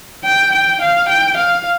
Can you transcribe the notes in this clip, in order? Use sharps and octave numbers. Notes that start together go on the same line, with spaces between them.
G5
G5
F5
G5
F5